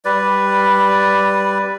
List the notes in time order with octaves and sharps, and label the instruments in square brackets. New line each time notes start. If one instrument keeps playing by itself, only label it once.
[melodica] G3 B4 D5